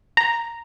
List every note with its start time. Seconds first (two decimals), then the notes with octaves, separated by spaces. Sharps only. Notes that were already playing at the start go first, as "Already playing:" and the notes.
0.17 A#5